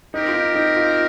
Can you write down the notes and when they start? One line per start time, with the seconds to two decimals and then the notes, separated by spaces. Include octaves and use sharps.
0.14 C4 D#4 G4 A#4
0.28 F4
0.34 D#4
0.55 D#4
0.76 F4